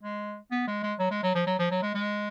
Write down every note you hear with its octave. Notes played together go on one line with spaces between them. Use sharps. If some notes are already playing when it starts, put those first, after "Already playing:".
G#3
B3
G#3
G#3
F#3
G#3
F#3
F3
F#3
F3
F#3
G#3
G#3